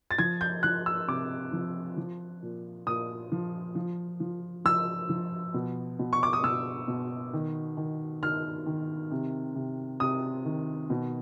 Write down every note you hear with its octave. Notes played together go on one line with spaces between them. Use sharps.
A6
F3 G#6
G6
F3 F#6
E6
C3 D6
F3
F3
A#2
A#2 D#6
F3
F3
F3
F3 E6
F3
B2
B2
C#6
D6
D#6
B2 E6
B2
D#3
D#3
D#3 F6
D#3
C3
C3
C3 D#6
D#3
B2